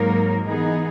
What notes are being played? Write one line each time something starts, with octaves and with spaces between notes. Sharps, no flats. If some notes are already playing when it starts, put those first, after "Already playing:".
Already playing: G#2 F#3 A#3 D#4 A#4
E3 B3 D#4 G#4